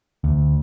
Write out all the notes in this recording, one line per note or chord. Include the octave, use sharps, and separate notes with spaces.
D2